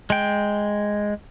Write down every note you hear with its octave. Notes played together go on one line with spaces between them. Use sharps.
G#3 G5